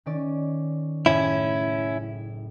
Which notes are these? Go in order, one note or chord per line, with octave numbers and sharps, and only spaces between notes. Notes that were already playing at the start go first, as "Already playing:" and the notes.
D#3 C#4 D5
F#1 A2 C#4 E4